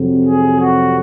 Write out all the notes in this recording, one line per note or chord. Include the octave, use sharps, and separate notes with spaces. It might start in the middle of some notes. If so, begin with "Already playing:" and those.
Already playing: F2 C3 F#3
G#4
F#4